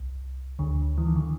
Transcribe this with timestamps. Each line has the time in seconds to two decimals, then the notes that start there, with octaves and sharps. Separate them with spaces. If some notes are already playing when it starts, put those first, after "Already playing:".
Already playing: C2
0.59 D2 D3
0.98 E3
1.07 D#3
1.16 D3